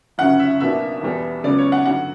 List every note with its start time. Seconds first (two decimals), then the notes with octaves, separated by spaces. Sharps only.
0.18 G1 F#2 C#3 F#3 F#5
0.39 E5
0.60 B1 B2 A#3 D4 E5
1.02 E2 B2 G3 B3
1.43 C#2 C#3 F#3 B3 D5
1.58 C#5
1.72 F#5
1.86 G2 D3 F#3 F#5